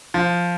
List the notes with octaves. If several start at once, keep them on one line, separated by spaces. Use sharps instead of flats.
F3